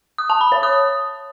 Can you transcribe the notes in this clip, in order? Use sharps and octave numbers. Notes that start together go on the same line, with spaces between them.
D#6
A5
B5
C#5
D#6